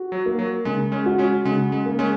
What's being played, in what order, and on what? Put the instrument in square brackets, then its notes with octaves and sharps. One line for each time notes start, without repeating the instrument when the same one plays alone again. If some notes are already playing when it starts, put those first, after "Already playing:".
Already playing: [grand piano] F#4
[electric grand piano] F#3
[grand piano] A#3
[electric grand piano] F#3
[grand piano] C#3 [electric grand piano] G#3
[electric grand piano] G#3 C#4
[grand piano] F#4
[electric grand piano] G#3 C#4
[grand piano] C#3 [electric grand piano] G#3
[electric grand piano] G#3
[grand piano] A#3
[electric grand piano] G#3 C#4